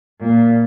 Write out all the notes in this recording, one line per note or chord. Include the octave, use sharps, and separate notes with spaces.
A#2